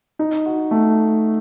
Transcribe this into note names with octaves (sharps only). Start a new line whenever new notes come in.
D#4
F#4
A3